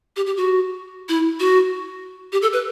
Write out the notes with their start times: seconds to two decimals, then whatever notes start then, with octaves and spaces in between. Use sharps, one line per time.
0.16 G4
0.26 G4
0.37 F#4
1.09 E4
1.40 F#4
2.32 G4
2.42 A4
2.53 B4